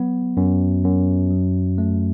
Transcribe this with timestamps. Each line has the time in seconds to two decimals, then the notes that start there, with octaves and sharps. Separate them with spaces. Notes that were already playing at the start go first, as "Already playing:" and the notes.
Already playing: F#3 B3
0.37 F#2
0.84 F#2
1.31 F#3
1.78 A3